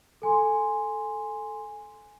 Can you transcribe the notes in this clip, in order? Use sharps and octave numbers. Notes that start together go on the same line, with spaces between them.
A4 G#5 C6